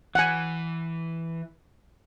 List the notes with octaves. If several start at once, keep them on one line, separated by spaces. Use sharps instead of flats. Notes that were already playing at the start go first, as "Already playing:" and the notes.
E3 F#5 G#5